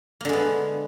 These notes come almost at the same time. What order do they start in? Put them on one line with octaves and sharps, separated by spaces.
A#3 D3 G#3 B3